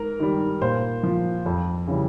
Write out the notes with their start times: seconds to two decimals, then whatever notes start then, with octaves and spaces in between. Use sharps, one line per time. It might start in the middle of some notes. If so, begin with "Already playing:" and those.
Already playing: G#2 A#4
0.19 D#3 G3
0.61 A#2 C5
1.03 F3
1.46 F2
1.88 C#3 E3 G3